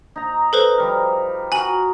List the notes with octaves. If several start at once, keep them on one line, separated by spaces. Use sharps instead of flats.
D#4 A#5
A4 B4 C5
F3 G3 A#4
F#4 A#4 G#5 F#7